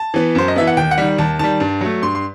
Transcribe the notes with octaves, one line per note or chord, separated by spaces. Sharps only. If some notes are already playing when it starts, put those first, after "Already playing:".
Already playing: A5
E3 B3
F#2 C5
D#5
E3 B3 E5
F#5
D#2 G5
F#5
D#3 G3
D#2 A5
D#3 G3 A5
G2 A5
F#3 A3
G2 C6
C6